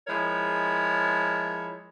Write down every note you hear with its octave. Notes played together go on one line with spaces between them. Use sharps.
F3 G#3 E4 A#4 C#5